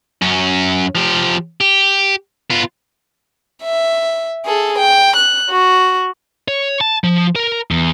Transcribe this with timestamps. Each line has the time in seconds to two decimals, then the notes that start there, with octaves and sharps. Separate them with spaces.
0.22 F#2 C#4
0.95 F3 G4
1.61 G4
2.50 B3 F4
3.63 E5
4.46 G#4 A4
4.78 G5
5.16 F#6
5.50 F#4
6.48 C#5
6.81 A5
7.04 F3
7.36 A#4
7.71 E2